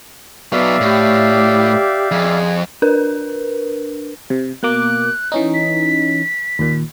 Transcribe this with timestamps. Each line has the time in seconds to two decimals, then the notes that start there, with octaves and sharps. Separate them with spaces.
0.53 F#3 B3 D5 E5 F5
0.81 A2 G4
2.11 F2 G#4
2.82 D4 A#4 B4
4.30 C3
4.63 B2 A#3 D6 F#6
5.32 E3 C#4 D#4
5.54 B6
6.59 D#2 A#2